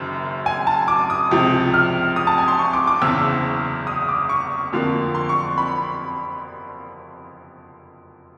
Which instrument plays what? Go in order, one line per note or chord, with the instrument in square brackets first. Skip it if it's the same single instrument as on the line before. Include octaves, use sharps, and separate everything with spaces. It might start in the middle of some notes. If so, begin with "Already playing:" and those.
Already playing: [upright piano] F#1 F#2 D#3
G#5
A5
D6
D#6
C#2 C3 F3
F6
D#6
A5
G#5
C6
C#6
D6
D6
F#1 E2 C#3 E6
D#6
D6
C#6
F2 D3 F3 A#3
C6
C#6
B5